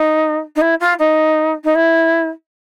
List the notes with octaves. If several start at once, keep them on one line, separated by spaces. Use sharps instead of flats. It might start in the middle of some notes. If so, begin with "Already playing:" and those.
Already playing: D#4
D#4
E4
F4
D#4
D#4
E4